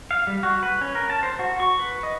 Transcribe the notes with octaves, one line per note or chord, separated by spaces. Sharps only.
F5
G3
F#4
B4
C#4
A#4
A5
C5
F#4
C#6
B4
D#5